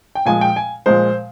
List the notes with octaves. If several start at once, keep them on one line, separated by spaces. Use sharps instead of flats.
G5
A#2 F3 G#3 G#5
G5
G#5
A#2 F3 G#3 C5